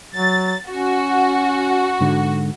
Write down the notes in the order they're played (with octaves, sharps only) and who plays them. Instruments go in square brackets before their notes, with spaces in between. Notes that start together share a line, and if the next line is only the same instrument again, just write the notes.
[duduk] F#3 [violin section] A6
[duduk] C#4 [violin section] F#4
[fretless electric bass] G#2 D3